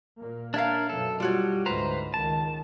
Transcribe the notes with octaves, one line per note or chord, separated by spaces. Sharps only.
A#2 A#3
D4 A#4 C#5 E5 F5
F#2 B2 A4
G3 F4 F#4 C#5
D2 G#2 B4 C5 A#5
C#2 D#3 A5